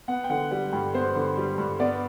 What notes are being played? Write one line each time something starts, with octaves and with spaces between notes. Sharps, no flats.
B3 F#5
G5
D3 F#5
G3 F#5
G2 G5
B3 C5
D3
G3
G2
B3 D5